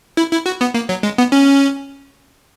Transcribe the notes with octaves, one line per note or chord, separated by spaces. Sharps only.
E4
E4
F#4
B3
A#3
F#3
G#3
B3
C#4